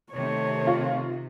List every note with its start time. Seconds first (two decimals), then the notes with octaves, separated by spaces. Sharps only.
0.13 C3 D#3 A3 C#5
0.67 F4 C#6